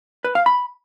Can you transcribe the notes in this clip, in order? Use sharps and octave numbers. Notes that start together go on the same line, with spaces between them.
B4
F5
B5